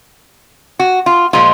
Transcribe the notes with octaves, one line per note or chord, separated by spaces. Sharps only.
F#4
F4
A#2 F3 G#3 F4